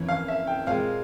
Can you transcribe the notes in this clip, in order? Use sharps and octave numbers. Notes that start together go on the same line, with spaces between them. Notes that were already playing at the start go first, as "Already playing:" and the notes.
Already playing: F2 E3 A#3 C#4
F5
E5
G5
A#2 G#3 C4 F4 F5